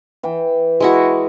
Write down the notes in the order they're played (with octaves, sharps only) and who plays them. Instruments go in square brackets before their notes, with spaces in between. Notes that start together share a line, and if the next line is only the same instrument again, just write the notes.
[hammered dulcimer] E3 G5
[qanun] G#3 E4 F#4